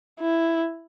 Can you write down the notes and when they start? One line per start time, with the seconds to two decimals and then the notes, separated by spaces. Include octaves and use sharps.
0.20 E4